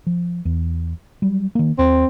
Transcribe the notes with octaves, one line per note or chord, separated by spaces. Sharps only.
F3
E2
F#3 G3
D#3 A#3
D#2 C4